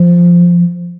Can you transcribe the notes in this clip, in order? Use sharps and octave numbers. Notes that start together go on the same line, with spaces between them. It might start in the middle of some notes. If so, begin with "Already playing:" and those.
Already playing: F3